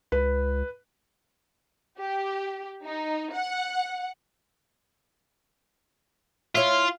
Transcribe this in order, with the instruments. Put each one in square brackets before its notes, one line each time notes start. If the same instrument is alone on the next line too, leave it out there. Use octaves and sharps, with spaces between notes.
[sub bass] C#2 [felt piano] B4
[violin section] G4
D#4
F#5
[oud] E4 C#5 E5 [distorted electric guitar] F4